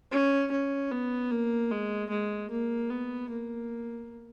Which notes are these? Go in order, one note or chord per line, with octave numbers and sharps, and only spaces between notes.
C#4
C#4
B3
A#3
G#3
G#3
A#3
B3
A#3